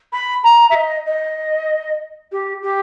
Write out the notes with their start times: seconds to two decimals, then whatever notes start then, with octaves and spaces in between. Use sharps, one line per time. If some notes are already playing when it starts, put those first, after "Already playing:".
0.13 B5
0.43 A#5
0.70 E5
0.75 D#5
1.06 D#5
2.32 G4
2.62 G4